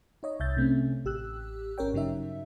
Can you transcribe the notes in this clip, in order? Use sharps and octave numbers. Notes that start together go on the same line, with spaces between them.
D#4 C#5 D#5
C2 E5 G6 A6
C3 A3 C4 C#4
A1 G4 E6 F#6
G#1 C#4 A#4 C#5 G5
G2 C#3 F#3 D#4 E5